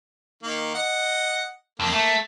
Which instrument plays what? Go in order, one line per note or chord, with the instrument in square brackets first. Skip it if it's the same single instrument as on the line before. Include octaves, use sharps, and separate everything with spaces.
[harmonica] D#3 A#3
D#5 F#5
[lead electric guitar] F2 [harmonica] A#3
[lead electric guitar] A3